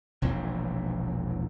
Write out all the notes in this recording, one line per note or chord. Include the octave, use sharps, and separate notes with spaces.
E1 A#1 E2 C4